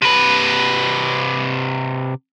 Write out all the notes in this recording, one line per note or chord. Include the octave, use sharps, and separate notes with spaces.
C3 B4